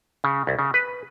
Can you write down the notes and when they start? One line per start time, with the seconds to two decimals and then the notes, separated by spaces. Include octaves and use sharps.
0.24 C#3
0.47 C2
0.59 C#3
0.74 B4